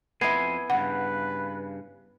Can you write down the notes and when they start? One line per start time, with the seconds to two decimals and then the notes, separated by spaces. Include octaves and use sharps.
0.21 F2 B3 E4 G#5 C6
0.70 G2 C#3 B4 F#5